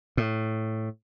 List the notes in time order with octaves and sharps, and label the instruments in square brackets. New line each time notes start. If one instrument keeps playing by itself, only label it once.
[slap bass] A2